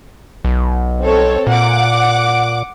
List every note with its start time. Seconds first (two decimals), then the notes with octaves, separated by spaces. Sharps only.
0.45 B1
1.01 C4 A4 C#5
1.47 A#2 F#5 D6